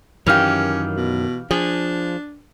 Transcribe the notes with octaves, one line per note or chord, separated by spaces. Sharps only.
F#2 D#3 E3 C#4 G4 F5 F6 F7
B2
F3 D4 G#4